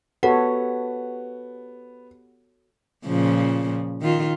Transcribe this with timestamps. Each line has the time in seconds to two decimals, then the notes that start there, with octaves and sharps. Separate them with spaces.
0.23 B3 F#4 G4 A4 C#5 F#5
3.05 A#2 C#3 F3
4.02 D#3 F4